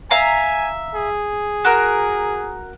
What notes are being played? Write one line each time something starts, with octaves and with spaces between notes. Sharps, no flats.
E5 F5 G#5 A#5
G#4
F#4 A#4